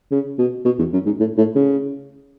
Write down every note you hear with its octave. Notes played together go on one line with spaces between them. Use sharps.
C#3
B2
B2
E2
F#2
G#2
A2
A2
C#3